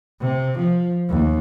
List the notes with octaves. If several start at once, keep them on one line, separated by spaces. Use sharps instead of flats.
C3
F3
D#2